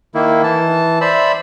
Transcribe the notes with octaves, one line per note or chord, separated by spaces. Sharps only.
D#3 A#3 E4
E3 A5
C5 D5 E5 B5 E6